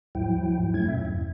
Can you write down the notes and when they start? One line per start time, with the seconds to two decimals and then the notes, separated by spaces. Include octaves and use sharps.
0.15 D#2 G#2 F3 F#3 E4 G5
0.74 F#2 F#3 A3 C#4 E4 G#6
0.88 F#2 B2 E5
1.05 E2 G2